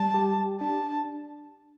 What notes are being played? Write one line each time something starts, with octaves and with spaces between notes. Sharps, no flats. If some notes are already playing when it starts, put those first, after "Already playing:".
Already playing: G3 A5
G4
D4 A5